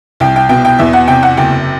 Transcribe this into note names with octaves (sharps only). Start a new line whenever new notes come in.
C2 G5
G5
B2 G5
G5
E2 E5
F#5
C3 G5
F#5
F#1 G5